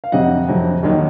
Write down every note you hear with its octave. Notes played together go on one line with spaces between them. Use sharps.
F5
F2 C3 F#3 D#5 F#5
F2 C3 F#3
D#2 D#3 F#3